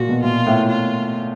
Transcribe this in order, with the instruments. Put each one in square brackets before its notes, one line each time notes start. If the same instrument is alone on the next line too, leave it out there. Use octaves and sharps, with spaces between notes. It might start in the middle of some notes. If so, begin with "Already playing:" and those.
Already playing: [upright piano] A#2 [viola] F#4
[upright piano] B2
[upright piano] A#2 [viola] F4
[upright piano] A2
[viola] F4